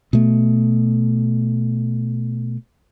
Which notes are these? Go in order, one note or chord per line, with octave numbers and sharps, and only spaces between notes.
B2 A3